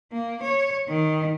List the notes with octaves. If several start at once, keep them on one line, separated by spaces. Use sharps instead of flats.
A#3
C#5
D#3